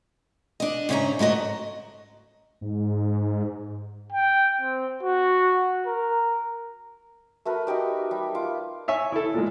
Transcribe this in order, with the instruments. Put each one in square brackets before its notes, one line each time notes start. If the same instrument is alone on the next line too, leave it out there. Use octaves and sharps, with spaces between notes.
[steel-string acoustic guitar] D4 D#5
G#2 C#3 C#4 E5 A#5
G#2 A3 F#4 D#5 A#5
[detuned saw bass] G#2
[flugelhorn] G5
C4
F#4
A#4
[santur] A3 F#4 A#4 B4
D#4 F#4 G4 D5
G3
F4 D6
[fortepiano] C#5 E5 G#5
E4 A4
A#2 G#3